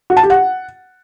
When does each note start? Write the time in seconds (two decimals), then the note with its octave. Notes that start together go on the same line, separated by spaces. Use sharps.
0.10 F#4
0.17 A5
0.23 G4
0.30 F#5